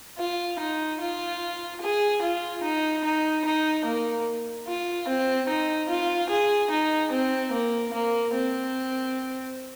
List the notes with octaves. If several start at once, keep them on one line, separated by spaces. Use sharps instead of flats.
F4
D#4
F4
G#4
F4
D#4
D#4
D#4
A#3
F4
C4
D#4
F4
G#4
D#4
C4
A#3
A#3
C4